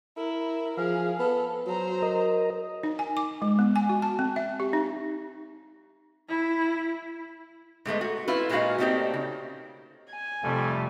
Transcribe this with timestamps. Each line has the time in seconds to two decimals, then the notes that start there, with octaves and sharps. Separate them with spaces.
0.17 E4 A#4
0.77 F3 G#4 F5
1.19 B3 A4
1.67 F#3 C5 A#5
2.02 A#4 D#5
2.83 D#4
2.99 G#5
3.17 D6
3.42 G#3
3.59 B3
3.76 G#5
3.89 F#4
4.02 A5
4.19 C4
4.36 E5
4.60 G4
4.73 D#4
6.29 E4
7.85 G#2 G#3 A3 B3
8.01 F#4
8.28 E4 F4 B4
8.49 A#2 G#3 D#4 E4 F#4 F5
8.78 A3 A#3 C4 D#4 G4 D5
9.14 C#3
10.10 G#5
10.43 F2 C3 G3 A3